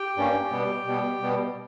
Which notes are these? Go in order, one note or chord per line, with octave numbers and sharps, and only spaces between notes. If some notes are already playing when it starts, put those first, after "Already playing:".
Already playing: G4 G5
G2 G3 A#3 C#4
B2 G3 B3
B2 G3 B3
B2 G3 B3